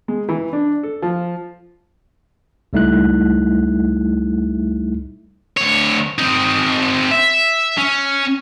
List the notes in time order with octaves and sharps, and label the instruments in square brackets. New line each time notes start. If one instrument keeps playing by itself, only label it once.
[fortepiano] G#3
E3
D4
A4
F3
[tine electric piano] C#2 G3 A3 D#4 E4 F#6
[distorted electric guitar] D2 C#5
C4 D#4
E5
C#4